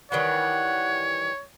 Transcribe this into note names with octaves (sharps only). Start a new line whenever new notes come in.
D#3 E3 G3 C#5 F#5